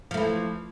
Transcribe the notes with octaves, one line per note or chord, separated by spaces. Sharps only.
E3 F3 A3